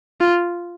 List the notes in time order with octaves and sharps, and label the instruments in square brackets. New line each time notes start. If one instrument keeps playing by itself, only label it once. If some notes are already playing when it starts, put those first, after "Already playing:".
[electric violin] F4